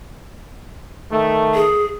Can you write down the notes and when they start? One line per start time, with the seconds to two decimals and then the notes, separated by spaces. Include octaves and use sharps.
1.11 D#3 A3
1.55 G#4